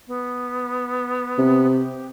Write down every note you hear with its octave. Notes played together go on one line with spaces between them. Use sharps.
B3
C3
G4